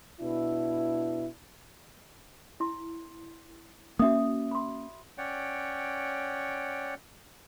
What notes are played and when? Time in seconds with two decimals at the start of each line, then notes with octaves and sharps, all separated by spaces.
0.20 B2 D4 E4
2.60 E4 C6
3.99 A#3 C#4 F#4 E5 D#6
4.51 B5 C6
5.18 C#4 C#5 D5 F#5 G5